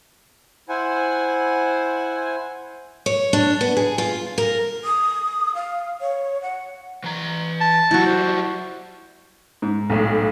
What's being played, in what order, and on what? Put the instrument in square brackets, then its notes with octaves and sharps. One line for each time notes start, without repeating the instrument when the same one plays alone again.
[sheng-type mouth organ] E4 C5 F#5 G#5
[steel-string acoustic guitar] C#5
D4
B3
G#4
F4
A#4
[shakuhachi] D#6
F5
C#5
F#5
[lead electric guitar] E3 A#5
[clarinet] A5
[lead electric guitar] F#3 G3 [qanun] E4 F#4
[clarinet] C5
[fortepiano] G#2
[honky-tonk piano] B1 A2